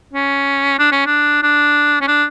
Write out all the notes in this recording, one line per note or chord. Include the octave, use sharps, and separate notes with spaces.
C#4
D4
C#4
D4
D4
C#4
D4